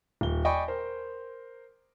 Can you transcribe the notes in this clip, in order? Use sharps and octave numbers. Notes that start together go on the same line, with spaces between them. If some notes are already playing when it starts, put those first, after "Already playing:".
D#1 G7
D5 D#5 G5 G#5 B5 C#6
A#4 C5